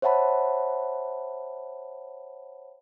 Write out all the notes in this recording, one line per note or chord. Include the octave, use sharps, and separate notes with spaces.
C5 C#5 E5 F#5 A5 B5